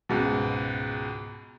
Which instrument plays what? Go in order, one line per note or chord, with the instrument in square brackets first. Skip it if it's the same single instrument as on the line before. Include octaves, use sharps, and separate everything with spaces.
[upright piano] C#2 G#2 B2